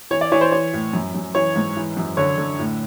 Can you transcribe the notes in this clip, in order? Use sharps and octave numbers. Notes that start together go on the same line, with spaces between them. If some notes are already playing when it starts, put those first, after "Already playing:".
E3 C#5
D5
E3 C#5
C5
E3 C#5
A2
F#2
F#2
E3 C#5
G#2
E3
F#2
D3 C#5
D3
A2